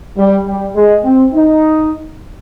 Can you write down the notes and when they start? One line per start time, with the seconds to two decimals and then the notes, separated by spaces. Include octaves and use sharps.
0.17 G3
0.46 G3
0.75 G#3
1.04 C4
1.33 D#4